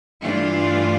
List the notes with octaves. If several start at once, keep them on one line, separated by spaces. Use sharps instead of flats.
G2 E3 A3 D4 F4